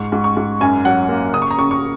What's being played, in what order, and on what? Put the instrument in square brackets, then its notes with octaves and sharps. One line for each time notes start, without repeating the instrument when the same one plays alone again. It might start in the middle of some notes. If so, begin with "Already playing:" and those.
Already playing: [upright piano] G#2 C#6
G#2
C#6
G#2
F#2 G#5
F#3 F#5
A#3
C#3 D#6
C#6
A#5
C#3 C#6
C#6